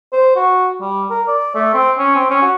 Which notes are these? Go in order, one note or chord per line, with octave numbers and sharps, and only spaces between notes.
C5
F#4
G3
A#4
D5
A3
C4
C#4
C4
C#4
F#4